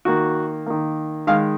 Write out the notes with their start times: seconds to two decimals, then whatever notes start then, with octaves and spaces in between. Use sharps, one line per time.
0.05 D#3 A#3 F#4
0.66 D#3 A#3
1.27 D#3 G#3 F5